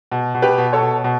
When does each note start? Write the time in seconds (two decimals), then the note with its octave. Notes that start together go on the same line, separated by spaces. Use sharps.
0.12 B2
0.34 B2
0.42 G4 B4
0.58 B2
0.73 A4 C#5
0.81 B2
1.04 B2